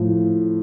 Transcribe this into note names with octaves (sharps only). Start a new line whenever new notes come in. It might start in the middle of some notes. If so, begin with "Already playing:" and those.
Already playing: A2 F3